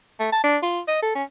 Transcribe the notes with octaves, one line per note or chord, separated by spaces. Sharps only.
A3
A5
D4
F4
D#5
A4
C#4